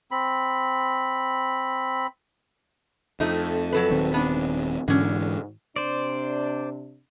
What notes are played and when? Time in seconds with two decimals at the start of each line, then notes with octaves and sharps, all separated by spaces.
0.11 C4 B5
3.20 F2 A3 D#4
3.73 F#3 A4 B4
3.91 D#1 D#3 C4
4.14 B3 D4
4.88 G#2 D3 E3 C#4
5.76 C3 D4 C5 D5